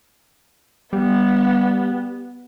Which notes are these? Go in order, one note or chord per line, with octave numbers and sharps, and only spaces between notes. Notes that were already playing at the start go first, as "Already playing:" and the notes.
G3 B3